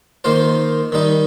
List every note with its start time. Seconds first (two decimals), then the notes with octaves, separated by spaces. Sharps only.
0.24 D#3 A#3 F4 C5
0.92 D#3 G3 D#4